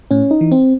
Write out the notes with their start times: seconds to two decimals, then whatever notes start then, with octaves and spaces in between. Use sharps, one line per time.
0.11 A2 C#4
0.31 D#4
0.41 E3
0.52 C4